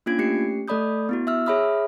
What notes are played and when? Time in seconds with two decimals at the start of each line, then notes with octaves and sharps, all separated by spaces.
0.06 A#3 C#4 D4 F4 G#6 D7
0.19 A3 C#4 G4 C7 C#7
0.68 A3 A4 D5 B5 D#6 G6
1.09 B3 E4 F#4
1.27 E5 E6 F6
1.46 G#4 C#5 E5 B5 D#6 F6